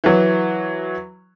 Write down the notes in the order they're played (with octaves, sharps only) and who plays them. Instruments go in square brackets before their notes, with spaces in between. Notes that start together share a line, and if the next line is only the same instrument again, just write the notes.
[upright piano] E3 F#3